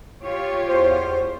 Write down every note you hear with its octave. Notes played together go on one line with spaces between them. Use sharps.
F4 G4 C#5
E2 C5